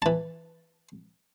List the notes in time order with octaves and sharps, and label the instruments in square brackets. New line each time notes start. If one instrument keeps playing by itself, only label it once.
[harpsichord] E3 A5